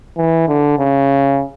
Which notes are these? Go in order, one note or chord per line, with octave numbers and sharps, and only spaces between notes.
E3
D3
C#3